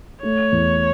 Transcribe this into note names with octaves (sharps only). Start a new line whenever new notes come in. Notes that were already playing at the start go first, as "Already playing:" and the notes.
A3 C#5
E2